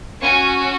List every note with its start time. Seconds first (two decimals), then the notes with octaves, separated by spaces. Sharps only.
0.21 C#4 F#4 G#5 C#6